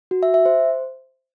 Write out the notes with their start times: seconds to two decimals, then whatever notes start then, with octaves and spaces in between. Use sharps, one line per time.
0.11 F#4
0.23 E5
0.34 E5
0.46 C5